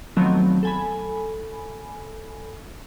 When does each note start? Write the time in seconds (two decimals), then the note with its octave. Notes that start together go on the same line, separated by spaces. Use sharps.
0.17 D#3 F3 F#3 A3 B3 C4
0.63 A4 G#5 B5